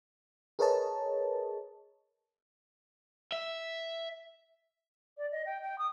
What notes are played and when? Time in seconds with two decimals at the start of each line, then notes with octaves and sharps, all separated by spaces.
0.59 G#4 A#4 B4 C#5 D#5 A5
3.32 E5
5.17 D5
5.31 D#5
5.46 G5
5.62 G5
5.78 D#6